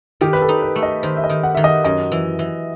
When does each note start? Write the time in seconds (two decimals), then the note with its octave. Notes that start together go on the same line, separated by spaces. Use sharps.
0.21 D#3 G4
0.33 B4
0.42 A4
0.49 D#4
0.62 B4
0.76 A3
0.83 D#5
1.03 D#3 C5
1.17 E5
1.24 D#5
1.30 D#3
1.43 F#5
1.55 D#3 E5
1.64 D#5
1.84 F#2 D#5
2.12 E3
2.39 E3